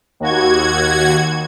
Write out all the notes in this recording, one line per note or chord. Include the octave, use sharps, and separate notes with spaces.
D#2 F#4 G#6